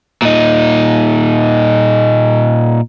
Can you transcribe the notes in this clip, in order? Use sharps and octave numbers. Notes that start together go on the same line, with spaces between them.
A#2 D#4